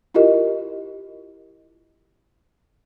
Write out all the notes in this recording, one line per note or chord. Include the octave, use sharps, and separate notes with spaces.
E4 F4 G4 A#4 D#5